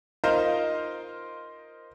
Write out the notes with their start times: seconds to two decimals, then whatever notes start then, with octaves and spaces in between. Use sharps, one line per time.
0.24 D#4 F4 A#4 C5 D#5 F5